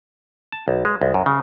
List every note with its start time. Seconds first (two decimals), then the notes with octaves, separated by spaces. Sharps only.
0.52 A5
0.68 B1
0.85 G#3
1.01 C2
1.14 F#2
1.26 C#3